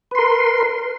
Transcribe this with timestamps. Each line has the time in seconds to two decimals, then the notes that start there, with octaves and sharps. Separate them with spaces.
0.11 B4
0.15 C6
0.19 A#4